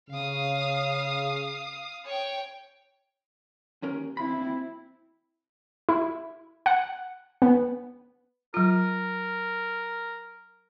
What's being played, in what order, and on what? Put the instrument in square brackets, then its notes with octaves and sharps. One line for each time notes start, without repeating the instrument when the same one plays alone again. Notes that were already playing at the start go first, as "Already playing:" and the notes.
[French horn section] C#3 [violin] F5 D#6
[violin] C#5 G5
[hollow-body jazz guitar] D#2 C#4 A#4
[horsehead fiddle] C4 E4 [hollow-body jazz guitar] B5
[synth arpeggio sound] E4
F#5
B3
[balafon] F#3 F4 [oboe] A#4